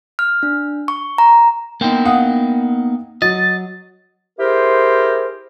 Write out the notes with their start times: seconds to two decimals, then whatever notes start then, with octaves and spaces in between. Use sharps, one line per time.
0.19 F6
0.43 D4
0.88 C#6
1.18 A#5
1.81 A#3 B3 D#4 G5
2.05 F5 F#5 D#6
3.22 F#3 D#5 A6
4.39 E4 G4 G#4 A#4 C5